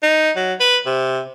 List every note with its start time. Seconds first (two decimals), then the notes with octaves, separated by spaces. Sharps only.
0.03 D#4
0.36 F#3
0.60 B4
0.86 C3